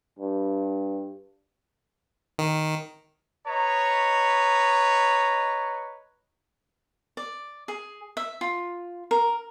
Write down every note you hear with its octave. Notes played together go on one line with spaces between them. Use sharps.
G2
D#3
B4 C#5 D#5 A#5
D5
G#4
E5
F4
A#4